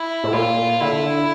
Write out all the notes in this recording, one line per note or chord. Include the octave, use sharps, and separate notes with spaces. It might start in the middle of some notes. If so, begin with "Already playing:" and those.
Already playing: E4
A2
A#2 F4
D3 E4